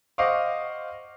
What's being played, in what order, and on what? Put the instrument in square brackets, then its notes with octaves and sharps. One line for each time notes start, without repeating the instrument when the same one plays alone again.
[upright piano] C5 D#5 F5 F#5 C#6 D6